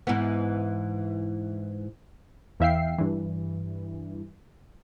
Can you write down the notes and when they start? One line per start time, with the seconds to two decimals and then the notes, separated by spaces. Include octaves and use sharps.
0.07 G#2 E3 B3
2.60 E2 E3 E5 F5 G5 C7
2.98 G2 E3